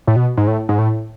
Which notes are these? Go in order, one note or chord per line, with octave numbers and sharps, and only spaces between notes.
A2
B2
G#2
A2
G#2
A2